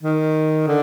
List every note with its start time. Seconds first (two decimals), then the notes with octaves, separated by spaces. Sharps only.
0.03 D#3
0.68 D3